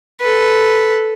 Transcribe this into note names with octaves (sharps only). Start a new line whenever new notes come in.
A4 B4